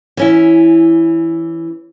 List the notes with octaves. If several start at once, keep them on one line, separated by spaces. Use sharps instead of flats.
E3 C#4 E4